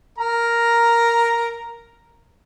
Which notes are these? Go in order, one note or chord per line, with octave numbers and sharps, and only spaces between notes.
A#4 A#5